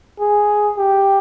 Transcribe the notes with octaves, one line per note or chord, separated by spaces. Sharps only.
G#4
G4